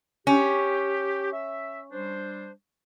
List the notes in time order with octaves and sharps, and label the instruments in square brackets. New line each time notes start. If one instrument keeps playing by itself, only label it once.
[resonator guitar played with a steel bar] C#4 [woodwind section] G4
[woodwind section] E5
G3 D4 C5